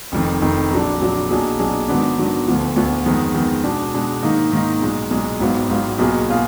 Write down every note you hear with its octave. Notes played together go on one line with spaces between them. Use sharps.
F1 F2 D#3
F1 F2 D#3
A#1 A#2 F#3 D4
A#1 A#2 F#3 D4
B1 A#2 F#3 D4 G#4
B1 A#2 F#3 D4 G#4
G#2 D#3 F#3 B3 D4
G#2 D#3 F#3 B3 D4
D2 D3 F3 B3
D2 D3 F3 B3
F2 D#3 G#3 B3
F2 D#3 G#3 B3
B2 G#3 D4
B2 G#3 D4
G#2 D#3 A#3 D#4
G#2 D#3 A#3 D#4
B1 A#2 G#3
B1 A#2 G#3
G#1 G#2 F#3 B3 F4
G#1 G#2 F#3 B3 F4
B1 B2 A#3 F4 G#4
B2 A#3 F4 G#4